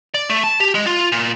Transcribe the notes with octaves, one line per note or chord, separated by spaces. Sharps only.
D5
A3
A5
G4
G#3
F4
A#2